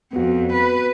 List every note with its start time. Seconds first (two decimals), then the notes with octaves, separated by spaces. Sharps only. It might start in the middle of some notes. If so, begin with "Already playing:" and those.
0.13 F2 B3 F#4
0.52 B4